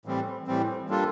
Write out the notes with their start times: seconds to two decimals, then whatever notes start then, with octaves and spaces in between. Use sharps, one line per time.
0.05 A2 E3 G3 C4
0.47 A2 E3 G3 C4
0.89 G3 A#3 D4 F4 A4